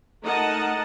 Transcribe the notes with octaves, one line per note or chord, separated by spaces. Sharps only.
A3 D#4 A#4 D#5 F#5 A5